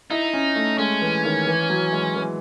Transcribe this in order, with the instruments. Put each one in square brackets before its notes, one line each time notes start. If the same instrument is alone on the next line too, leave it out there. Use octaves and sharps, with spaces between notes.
[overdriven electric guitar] D#4 [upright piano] E4
[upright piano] C#4
A3
[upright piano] G#3 [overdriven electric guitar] C#4
[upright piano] E3
D#3
E3
F#3
G#3
E3